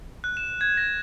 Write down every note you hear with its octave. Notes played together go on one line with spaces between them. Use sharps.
F#6
E7
G#6
A#6